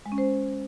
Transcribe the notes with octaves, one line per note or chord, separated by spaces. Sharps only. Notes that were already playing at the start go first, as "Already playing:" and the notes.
G#3
C#4
C5